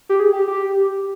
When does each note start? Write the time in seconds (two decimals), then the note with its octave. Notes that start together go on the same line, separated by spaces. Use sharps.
0.09 G4
0.20 G#4
0.33 G4
0.48 G4